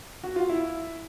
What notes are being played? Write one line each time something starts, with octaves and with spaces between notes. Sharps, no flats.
F#4
F4
E4